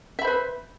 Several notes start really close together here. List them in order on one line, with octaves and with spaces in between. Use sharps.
E5 B5 C5 B4